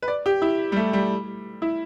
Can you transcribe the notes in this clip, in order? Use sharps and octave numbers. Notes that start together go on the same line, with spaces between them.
B4
D5
G4
E4
G3
A3
G3
E4